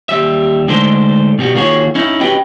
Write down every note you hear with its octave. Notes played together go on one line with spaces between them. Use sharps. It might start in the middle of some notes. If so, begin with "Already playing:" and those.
D#2 G3 E5
D3 G#3 A3 D4 D#4 C5
B2 G3 F#4
D#3 A#3 F4 F#4 G#4 C#5
C#4 D#4 E4
C#4 F#4 G4 B4 D#5 G5